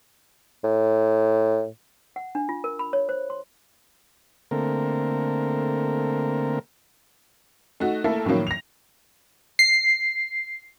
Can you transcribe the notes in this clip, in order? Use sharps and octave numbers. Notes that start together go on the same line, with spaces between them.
A2
F#5
D4
F4
A#4
B5
C#5
C5
C6
D3 A3 A#3 C4 A#4
A3 D#4 F#4
A3 A#3 E4 A4
A2 D#3 F3 F#3 A#3
A#6 F7
C7